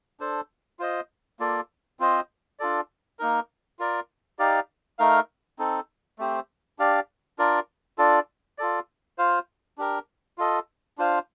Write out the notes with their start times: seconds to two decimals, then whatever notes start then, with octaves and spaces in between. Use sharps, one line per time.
0.20 D4 A4 C5
0.79 F4 C5 D#5
1.40 A#3 F4 A4 D5
2.00 C4 F4 C5 D#5
2.59 D4 F4 A4 D5
3.19 A#3 D#4 A#4
3.79 F4 A#4 D5
4.39 D#4 G4 D5 F5
4.99 A3 D#4 A#4 F5
5.59 C4 D#4 A4
6.19 A3 C4 G4 C5
6.79 D4 G4 D5 F5
7.39 D4 F4 A#4 D5
7.98 D4 F4 A4 D5
8.58 F4 A4 D5
9.18 F4 C5 F5
9.78 D4 G4 A#4
10.38 F4 A4 D#5
10.98 D4 F4 C5 F5